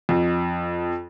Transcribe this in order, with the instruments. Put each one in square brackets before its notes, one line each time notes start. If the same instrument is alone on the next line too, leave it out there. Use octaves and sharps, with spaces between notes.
[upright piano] F2